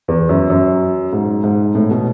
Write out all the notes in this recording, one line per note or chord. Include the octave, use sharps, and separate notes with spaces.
E2
F#2
F#2
G#2
G#2
A2
B2